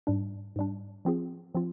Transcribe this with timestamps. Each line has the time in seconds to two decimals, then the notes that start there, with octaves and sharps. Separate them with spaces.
0.07 G#2 G3 D4
0.56 G#2 G3 D4
1.05 F3 C4 F4 G#4
1.55 F3 C4 F4